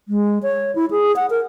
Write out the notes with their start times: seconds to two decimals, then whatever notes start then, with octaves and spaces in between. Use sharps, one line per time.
0.08 G#3
0.43 C#5
0.75 E4
0.91 G#4
1.16 F#5
1.30 A#4